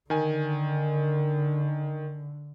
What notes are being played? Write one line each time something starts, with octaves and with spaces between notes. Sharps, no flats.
D3 D#3 G#5